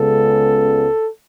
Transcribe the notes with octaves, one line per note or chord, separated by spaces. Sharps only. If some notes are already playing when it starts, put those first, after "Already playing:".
Already playing: C#2 C#3 G#3 B3 A4